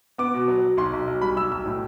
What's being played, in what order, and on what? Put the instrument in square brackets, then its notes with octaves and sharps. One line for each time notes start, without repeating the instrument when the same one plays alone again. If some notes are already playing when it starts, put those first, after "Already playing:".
[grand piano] B3 D6
B2
F#3
F#3
B1 C6
B1
B1
G3 B5
B1 E6
B1 E6
A2